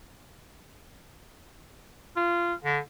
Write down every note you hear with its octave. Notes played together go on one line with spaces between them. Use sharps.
F4
D3